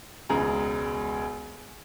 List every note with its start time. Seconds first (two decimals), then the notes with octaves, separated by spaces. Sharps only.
0.29 E1 C#2 G#4 A#5